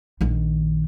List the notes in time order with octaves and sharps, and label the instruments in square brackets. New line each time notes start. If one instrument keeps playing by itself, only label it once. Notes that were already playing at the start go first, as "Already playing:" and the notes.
[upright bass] A#1 D#3